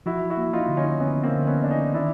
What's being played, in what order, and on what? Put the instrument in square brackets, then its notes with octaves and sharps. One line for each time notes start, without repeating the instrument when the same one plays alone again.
[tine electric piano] F3 [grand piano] E4 F#4
[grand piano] E4 F#4
[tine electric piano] A#3
[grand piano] D#4 F4
[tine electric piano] D3
[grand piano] C#4 D#4
[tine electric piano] D3 [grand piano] B3 C#4
[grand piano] A#3 C4
[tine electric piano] D3
[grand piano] B3 C#4
[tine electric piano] D3 [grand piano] D4
[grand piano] C#4 D#4
[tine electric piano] D#3 [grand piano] D4 E4